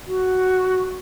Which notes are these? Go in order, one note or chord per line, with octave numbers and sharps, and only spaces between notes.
F#4